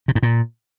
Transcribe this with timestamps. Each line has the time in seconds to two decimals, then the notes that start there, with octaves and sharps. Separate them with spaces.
0.08 C3
0.15 G#2
0.23 A#2